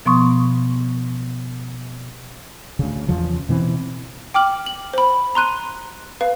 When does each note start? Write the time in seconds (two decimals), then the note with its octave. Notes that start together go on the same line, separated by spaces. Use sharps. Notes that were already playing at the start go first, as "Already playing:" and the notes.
0.05 B2 F3 B3 C6 C#6 D#6
2.79 D2 C#3
3.08 E2 C#3 F3
3.49 B2 E3 B3 C4
4.34 G5 D6 F6 F#7
4.66 F#7
4.94 C5 B5
5.35 A#5 C6 F#6 D#7
6.21 B4 F5